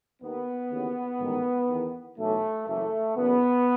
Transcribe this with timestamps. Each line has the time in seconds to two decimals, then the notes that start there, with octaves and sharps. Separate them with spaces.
0.22 D#2 D#3 B3
0.70 D#2 C#3 E3
1.20 A1 G#2 D#3
1.69 E2 D#3
2.18 B1 A2 E3 A3
2.67 F#1 F#2 E3 A3
3.16 F#1 E2 C#3 B3